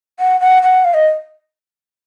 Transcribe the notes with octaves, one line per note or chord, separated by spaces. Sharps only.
F#5
F#5
F#5
F5
D#5